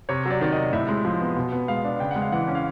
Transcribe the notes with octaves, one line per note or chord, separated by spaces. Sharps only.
C3 C#5
F#3 D5
D#3 D5
C3 D#5
A2 E5
G#3
F3
B3
B2
B3
G#3 F5
D4
C#3 G5
G#3 F#5
F5
E3 F#5
C#4
F5